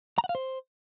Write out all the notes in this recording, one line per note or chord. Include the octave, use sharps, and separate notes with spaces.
A#5
F#5
F5
C5